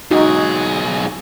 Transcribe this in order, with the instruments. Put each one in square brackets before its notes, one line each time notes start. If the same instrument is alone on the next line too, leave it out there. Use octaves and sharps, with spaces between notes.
[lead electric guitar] B1 G#4 [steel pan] D#4 F#4